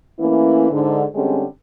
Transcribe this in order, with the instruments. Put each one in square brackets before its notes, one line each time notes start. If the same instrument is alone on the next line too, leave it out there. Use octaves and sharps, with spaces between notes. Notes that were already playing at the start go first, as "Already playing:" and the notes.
[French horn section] E3 A3 A#3 C#4 E4
G#2 D3
D3 G3 G#3 C4 C#4